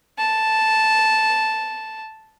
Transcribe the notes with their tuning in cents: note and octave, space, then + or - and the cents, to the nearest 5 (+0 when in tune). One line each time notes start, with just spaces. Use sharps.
A5 -5